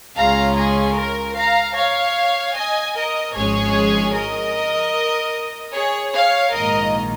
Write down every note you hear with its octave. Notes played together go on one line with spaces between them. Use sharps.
C#2 C#3 G#3 C#4 F4 F5 A#5
G#4
A#4
F5 A#5
C#5 F5
D#5 G#5
A#4 D#5
G#1 G#2 F3 G#3 C#4 G#4 C#5
A#4 D#5
G#4 C#5
C#5 F5
A#1 G#2 D#3 A#3 A#4 D#5